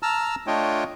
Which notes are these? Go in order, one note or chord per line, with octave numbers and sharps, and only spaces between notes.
A5 A#5 E6 F6
A3 D4 F4 C#5 D#5 G5